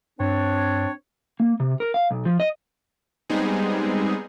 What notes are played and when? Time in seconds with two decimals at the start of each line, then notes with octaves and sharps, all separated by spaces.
0.20 G2 C4 D4 C#5
1.40 A#3
1.60 C3
1.80 A#4
1.94 F5
2.11 B1
2.25 F3
2.40 D#5
3.29 G3 G#3 B3 C4 D#4 G#4